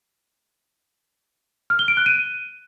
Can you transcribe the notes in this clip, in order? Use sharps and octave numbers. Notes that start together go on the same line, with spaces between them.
F6
G7
D7
F#6
D#7